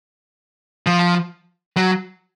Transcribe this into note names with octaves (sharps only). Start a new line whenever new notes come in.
F3
F#3